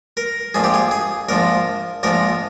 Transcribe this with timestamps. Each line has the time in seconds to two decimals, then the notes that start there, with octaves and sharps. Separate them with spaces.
0.17 A#4
0.54 A#1 G#2 F3 G#4
0.64 G4
0.74 G#4
0.91 G#4
1.29 A#1 G#2 F3 A#4
2.03 A#1 G#2 F3 A#4